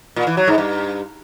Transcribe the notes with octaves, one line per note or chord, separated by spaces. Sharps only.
A#2
E3
F#3
G#2
G2